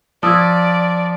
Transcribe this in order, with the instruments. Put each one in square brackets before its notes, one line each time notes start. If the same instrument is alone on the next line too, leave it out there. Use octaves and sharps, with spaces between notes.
[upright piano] F3 [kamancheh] D5 [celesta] D#6 E6 G#6